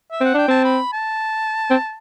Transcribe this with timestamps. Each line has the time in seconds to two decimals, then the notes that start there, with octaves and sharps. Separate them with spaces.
0.11 E5
0.21 C4 F#5
0.34 D4 G5
0.48 C4 A5
0.64 B5
0.93 A5
1.71 C4